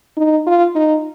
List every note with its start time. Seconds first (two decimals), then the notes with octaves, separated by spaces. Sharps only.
0.17 D#4
0.47 F4
0.75 D#4